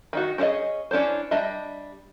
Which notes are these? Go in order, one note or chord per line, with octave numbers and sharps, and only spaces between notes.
D#3 D#4 F#4
C4 C#4 E4 G#4 D#5
C#4 D4 E4 C5
G3 D4 D#5 E5